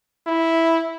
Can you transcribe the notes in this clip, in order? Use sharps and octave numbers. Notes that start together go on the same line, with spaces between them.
E4